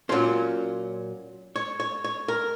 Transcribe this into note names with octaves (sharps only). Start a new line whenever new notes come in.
A#2 F#3 C#4 C5
C#5
C#5
C#5
A#4